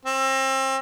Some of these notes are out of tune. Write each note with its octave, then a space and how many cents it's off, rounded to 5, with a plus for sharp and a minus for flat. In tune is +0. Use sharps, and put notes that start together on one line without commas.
C4 +30